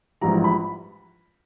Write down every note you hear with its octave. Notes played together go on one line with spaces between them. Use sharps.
A#1 G#2 E3 G3 A#5
B5